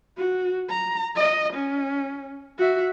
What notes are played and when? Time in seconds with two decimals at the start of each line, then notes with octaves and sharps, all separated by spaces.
0.18 F#4
0.69 A#5
1.16 D#5
1.53 C#4
2.58 F#4 E5